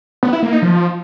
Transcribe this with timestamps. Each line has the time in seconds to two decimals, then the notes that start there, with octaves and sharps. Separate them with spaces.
0.23 B3
0.33 E4
0.43 A#3
0.52 D#4
0.62 F3